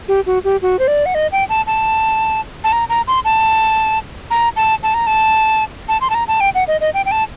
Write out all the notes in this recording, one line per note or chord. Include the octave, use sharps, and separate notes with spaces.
G4
F#4
G4
F#4
C5
D5
F#5
D#5
G5
A5
A5
A5
A#5
A#5
C6
A5
A#5
A5
A5
A#5
A5
A5
C6
A5
A#5
A5
G5
F#5
D#5
D#5
G5
G5
A5